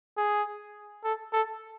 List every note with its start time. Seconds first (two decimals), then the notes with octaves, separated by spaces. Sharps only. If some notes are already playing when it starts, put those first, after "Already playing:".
0.17 G#4
1.04 A4
1.33 A4